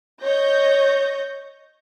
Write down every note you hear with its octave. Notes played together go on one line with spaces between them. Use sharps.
C#5 D#5 G6 A#6